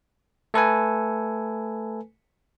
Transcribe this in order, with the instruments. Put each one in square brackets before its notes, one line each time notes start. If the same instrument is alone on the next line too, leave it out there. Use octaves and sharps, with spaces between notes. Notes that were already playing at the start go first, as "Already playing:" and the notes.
[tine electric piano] A3 A4 B4 G#5